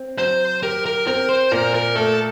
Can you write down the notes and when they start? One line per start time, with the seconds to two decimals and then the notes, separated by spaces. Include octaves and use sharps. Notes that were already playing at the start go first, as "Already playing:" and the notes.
Already playing: C4
0.18 F#3 C5
0.63 G4 A#4
0.86 A#4
1.07 C4 A#4
1.29 C5
1.51 A#2 A#4
1.74 A#4
1.95 A3 A4